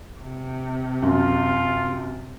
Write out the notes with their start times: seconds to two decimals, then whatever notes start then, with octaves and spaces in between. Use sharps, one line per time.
0.19 C3
1.02 F#2 F4